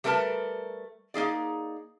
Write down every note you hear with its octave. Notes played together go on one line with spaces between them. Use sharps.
G3 A3 A#4 B4 A5
A#3 D#4 G#4 D5